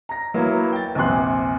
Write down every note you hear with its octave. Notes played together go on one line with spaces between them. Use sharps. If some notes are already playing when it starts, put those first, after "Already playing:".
A#5 A#6
F#3 A#3 B3 E4
G5 A6
A#1 E2 C3 G#5 C6 F#6